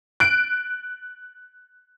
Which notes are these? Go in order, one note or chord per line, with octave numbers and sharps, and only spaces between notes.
F#6 D7